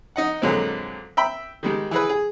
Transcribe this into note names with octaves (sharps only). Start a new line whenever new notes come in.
D#4 D#5 F#5
F2 A#2 D3 F#3 G#3 C4
E5 G5 B5
D#3 G3 G#3
E3 G#4 B4
G#4